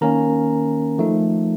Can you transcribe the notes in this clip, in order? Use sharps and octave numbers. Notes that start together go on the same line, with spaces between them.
D#3 A#3 C#4 A#4 A#5
F3 A3 D#4